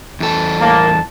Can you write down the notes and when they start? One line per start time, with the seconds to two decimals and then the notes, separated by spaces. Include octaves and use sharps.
0.20 E2 A4
0.61 A2 A#3 A5